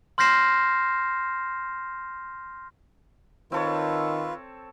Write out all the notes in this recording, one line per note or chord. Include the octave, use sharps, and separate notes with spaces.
C6 F6 G6 A#6 C7 E7
D#3 C4 F4 A4 B4 C#5